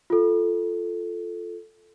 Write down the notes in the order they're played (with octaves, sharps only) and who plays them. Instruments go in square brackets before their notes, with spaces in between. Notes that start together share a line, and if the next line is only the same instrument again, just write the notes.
[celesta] F4 A4